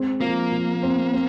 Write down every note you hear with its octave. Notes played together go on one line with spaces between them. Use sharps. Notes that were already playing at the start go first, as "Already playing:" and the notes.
Already playing: G#3 C4
F3 A#3
F3
C4
C4